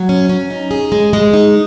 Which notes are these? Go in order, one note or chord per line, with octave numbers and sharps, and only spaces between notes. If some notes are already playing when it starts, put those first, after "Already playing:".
Already playing: F#3
C#4
C#4
D#4
G#4
G#3
G#3
D#4